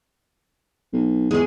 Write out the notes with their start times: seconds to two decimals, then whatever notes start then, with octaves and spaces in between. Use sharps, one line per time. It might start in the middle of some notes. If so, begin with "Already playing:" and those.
0.93 B1
1.31 E2 G#3 G#4